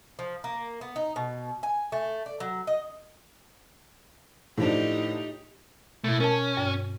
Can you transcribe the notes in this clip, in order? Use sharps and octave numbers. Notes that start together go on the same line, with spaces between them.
F3
A#3
B3
D#4
B2
G#5
A3
D5
F#3
D#5
A2 F3 D4 D#4 G4
B2 A3 E4
C#4 A#4 A5
G2